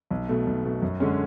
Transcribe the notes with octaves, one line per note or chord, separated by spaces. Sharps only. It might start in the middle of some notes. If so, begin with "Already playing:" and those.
B1
B2 A3
B1
B2 A3
F#2
D3 G#3 C#4